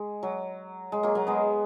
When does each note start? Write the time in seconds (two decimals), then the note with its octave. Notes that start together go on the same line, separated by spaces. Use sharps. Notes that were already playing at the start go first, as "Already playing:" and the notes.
Already playing: G#3
0.23 F#3
0.92 G#3
1.03 F#3 A#3
1.15 F#3 A#3
1.27 G#3 B3